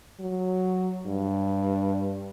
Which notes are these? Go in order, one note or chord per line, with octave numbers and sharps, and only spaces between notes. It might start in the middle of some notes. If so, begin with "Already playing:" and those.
F#3
G2